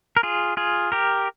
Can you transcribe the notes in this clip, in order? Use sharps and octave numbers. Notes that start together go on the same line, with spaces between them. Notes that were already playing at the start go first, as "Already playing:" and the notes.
A#4
F4 G#4
F4 G#4
G4 A#4